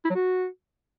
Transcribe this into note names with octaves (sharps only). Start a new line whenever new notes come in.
E4
F#3
F#4